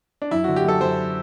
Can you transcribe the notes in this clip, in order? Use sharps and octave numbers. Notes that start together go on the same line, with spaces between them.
D4
F#2 E4
D3 F#4
G4
F#2 A4
F#2 C5